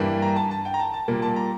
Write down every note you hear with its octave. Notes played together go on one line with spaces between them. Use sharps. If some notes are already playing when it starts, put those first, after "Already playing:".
Already playing: G2 E3 G3 A#3
A#5
A5
A5
G5
A#5
A5
A5
A#2 G3 A#3
A5
A#5